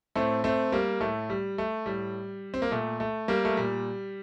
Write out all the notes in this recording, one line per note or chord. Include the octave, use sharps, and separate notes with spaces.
A2 A3 C4
A3 C4
G3 A#3
A2 A3
G3
A3
A2 G3
C4
A#3
A#2 A3
A3
G3 A#3
A3
A#2 G3